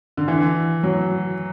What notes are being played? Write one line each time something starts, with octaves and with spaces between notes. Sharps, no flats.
D3
E3
F#3